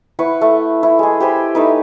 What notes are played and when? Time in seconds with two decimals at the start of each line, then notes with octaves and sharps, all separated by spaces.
0.19 E4 B4 F#5 C#6
0.41 A3
0.83 E4
0.99 G#3 G#4
1.20 G4 C5 G#5 B5
1.55 A3 D#4 B4